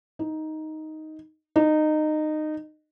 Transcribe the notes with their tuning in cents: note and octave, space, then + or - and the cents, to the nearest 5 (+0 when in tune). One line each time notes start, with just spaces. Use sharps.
D#4 +5
D#4 -20